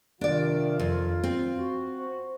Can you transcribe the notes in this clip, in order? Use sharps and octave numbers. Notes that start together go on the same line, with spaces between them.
C3 D#3 D4 F4 D5
F2
C4
F#4
C5